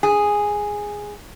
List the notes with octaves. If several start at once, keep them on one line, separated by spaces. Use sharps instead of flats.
G#4